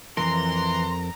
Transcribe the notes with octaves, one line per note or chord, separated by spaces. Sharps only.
F2 A#2 E3 A#4 A#5 C6